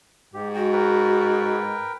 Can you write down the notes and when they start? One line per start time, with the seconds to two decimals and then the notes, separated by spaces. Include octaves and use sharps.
0.34 G#2 G4
0.55 G#3 F#4 G5
0.73 A#4 B4 G5